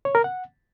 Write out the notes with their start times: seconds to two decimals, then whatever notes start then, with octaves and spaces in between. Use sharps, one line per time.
0.05 C#5
0.15 A#4
0.24 F#5